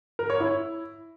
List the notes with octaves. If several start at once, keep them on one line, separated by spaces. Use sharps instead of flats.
A#4
C#5
E4